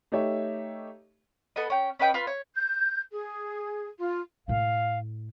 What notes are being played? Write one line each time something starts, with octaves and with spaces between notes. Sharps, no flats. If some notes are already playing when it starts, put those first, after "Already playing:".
A3 D#4 G4 C#5 E5
B3 A4 D#5
C#4 G5
C#4 B4 D#5 G5
F4 B4 F6
C#5
G6
G#4
F4
A2 A3 F5